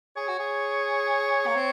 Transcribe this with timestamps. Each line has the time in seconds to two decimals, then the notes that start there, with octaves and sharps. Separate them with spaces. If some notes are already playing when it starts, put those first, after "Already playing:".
0.16 G#4 C#5
0.28 F#4
0.39 G#4
1.47 A#3
1.56 C4